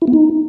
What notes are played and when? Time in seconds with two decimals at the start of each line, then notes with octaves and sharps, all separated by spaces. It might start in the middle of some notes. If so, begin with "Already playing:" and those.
0.02 E4
0.08 B3
0.13 D#4